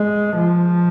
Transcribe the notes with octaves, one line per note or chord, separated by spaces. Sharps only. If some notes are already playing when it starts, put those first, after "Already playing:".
Already playing: G#3
F3